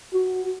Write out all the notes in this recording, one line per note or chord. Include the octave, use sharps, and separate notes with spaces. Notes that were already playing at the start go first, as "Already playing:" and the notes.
F#4